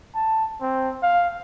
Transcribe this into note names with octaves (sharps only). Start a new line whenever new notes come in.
A5
C4
F5